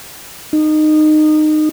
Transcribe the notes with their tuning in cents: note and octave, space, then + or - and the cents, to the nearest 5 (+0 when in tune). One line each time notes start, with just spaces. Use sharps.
D#4 -20